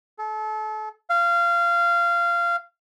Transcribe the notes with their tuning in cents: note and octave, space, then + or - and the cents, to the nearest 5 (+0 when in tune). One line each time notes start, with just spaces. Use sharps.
A4 -35
F5 -20